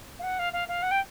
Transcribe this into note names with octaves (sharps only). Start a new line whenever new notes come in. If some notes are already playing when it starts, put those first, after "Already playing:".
F5
F#5
F5
F5
F5
F#5
G5